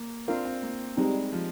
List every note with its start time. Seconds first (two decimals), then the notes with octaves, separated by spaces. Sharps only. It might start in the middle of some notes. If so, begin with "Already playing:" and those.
Already playing: A#3
0.28 C4 D4 F4 A#4 F5
0.45 C4
0.63 A#3
0.97 G3 G#3 C4 D#4
1.33 F3